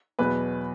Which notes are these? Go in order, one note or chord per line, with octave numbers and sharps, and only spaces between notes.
E2 B2 F#3 B3 B4